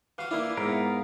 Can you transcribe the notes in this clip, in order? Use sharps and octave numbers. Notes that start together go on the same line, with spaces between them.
E3 F#4 F5
E3 A#3 D4 E4
G#2 B3 A#4